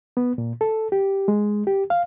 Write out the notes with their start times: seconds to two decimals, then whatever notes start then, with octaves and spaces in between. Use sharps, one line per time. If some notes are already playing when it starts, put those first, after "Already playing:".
0.17 B3
0.38 A#2
0.61 A4
0.92 G4
1.28 G#3
1.67 G4
1.90 F5